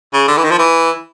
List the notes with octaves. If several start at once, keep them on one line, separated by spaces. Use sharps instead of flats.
C#3
D3
E3
D#3
F3
E3